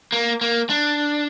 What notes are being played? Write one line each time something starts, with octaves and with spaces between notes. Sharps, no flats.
A#3
A#3
D4